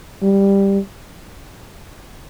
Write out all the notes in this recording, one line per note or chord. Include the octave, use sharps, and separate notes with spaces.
G3